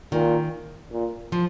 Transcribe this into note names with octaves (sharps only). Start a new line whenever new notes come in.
A#2 D#3
A#2
F3